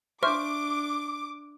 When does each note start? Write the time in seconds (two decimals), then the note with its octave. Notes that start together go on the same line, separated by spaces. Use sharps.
0.23 D4 C5 E5 C#6 D6 F6